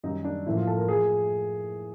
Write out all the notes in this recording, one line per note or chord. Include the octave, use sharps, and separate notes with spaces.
F#2 D#3 G3 D#4
D4
A2 F3 A#3 E4
F4
A4
A#4
F3 A3 G#4